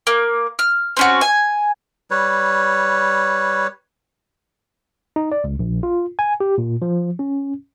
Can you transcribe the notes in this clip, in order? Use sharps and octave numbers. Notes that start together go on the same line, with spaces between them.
A#3
F6
C4 C#4 F#4
G#5
G3 B4 C#5
D#4
D5
C#2
A#1
F4
G#5
G4
A#2
F3
C#4